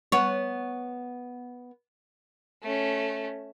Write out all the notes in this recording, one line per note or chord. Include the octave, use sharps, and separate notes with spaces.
B3 C#5
A3 C#4